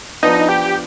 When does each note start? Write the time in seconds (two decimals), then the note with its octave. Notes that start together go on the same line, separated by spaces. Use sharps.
0.23 F3 B3 D4 D#4
0.49 G4